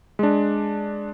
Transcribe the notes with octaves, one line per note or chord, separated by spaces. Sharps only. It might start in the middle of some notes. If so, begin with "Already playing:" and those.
G#3 D4